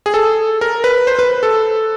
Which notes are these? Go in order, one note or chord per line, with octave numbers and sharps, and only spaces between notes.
G#4
A4
A#4
B4
C5
B4
A4